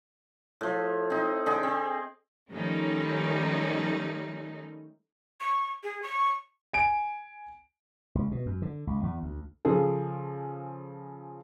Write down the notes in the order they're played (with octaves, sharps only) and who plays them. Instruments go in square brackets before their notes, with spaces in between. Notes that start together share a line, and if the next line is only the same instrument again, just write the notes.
[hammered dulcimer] A2 F3
C4 D#4
D3 G#4 D#5 G5
C4
[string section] D#3 F3 G3 A3 C#4 D#4
[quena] C#6
G#4
C#6
[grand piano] G#5 D7
[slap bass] C#2
B2
F#2
D3
C#2
E2
D2
[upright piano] C#3 F3 C#4 G#4 A4